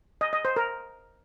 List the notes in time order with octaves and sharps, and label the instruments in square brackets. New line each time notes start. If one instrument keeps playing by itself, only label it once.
[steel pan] D#5
D#5
C5
A#4